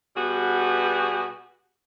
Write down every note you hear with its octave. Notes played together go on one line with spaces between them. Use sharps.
B2 G3 B3 F#4 G#4